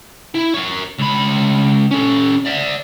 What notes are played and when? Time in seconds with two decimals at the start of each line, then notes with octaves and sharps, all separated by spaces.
0.35 E4
0.54 A#4 C#5
0.99 C#2 B5
1.91 C#4 A4
2.46 D5 E5